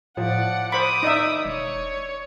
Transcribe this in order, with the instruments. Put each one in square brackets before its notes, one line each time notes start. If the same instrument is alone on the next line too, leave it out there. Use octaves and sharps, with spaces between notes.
[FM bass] A2 [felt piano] F3 [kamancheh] D5 F#5
[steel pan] C5 B5 [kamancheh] D6 D#6
[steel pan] D#4 E5 [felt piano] D5
[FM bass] E1 [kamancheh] C#5